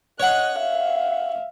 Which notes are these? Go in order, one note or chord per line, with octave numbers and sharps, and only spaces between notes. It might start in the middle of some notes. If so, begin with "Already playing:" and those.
C#5 D#5 F#5 F#6
E5 F5